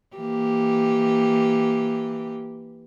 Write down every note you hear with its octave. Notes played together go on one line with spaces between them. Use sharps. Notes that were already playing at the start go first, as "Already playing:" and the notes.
E3 A#3 G4